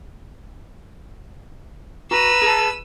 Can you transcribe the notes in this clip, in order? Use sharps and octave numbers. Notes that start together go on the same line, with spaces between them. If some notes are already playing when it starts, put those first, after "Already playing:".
F#4 B4 A#5 E6 D#7
G#4 A5